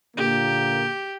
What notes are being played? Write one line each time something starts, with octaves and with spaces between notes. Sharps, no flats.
A#2 D3 A#3 G4